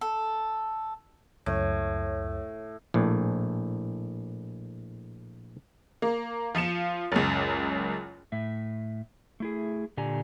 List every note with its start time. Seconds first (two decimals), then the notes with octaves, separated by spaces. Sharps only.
0.01 A4
1.46 C#2 F#2 A2 C#5
2.94 A#1 A2
6.02 A#3
6.55 F3 F4 C#7 E7
7.12 F#1 C#2
8.32 A2 E5
9.40 A3 E4 G#4
9.97 A#2 D3 G4 D5 G#5 A#5